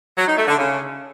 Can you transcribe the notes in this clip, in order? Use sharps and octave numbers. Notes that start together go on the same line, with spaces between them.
F#3
D#4
A3
D3
C#3